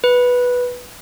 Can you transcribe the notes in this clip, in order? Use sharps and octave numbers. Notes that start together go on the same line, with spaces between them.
B4